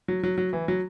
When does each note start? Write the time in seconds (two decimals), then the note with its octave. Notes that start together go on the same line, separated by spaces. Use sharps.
0.08 F#3
0.23 F#3
0.38 F#3
0.53 E3
0.68 F#3